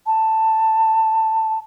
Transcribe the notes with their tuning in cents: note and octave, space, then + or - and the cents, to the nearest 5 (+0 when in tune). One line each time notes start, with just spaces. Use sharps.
A5 +10